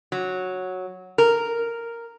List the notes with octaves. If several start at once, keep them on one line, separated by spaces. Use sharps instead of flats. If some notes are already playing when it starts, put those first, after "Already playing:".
F#3
A#4